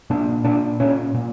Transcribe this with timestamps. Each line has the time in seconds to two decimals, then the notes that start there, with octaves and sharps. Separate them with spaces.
0.10 A#2 D4
0.45 A#2 D4
0.80 A#2 C#4
1.14 A#2